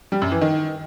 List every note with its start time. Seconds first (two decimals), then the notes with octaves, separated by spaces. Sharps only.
0.12 G3
0.22 F#2
0.32 E3
0.41 D#3